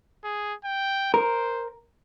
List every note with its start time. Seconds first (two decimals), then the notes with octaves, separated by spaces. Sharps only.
0.24 G#4
0.65 G5
1.14 A#4 C5